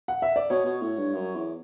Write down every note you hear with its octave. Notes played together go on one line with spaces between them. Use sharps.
F#5
E5
D5
B2 C#5
B2
A2
G2
F#2
E2